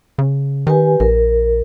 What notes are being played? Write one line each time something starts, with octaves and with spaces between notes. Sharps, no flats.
C#3
D#3 G4 B4 G#5
A#1 A#4